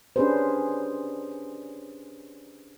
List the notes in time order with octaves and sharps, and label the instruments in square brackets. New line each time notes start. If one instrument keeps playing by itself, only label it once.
[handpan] C#4 D4 G4 G#4 B4 C5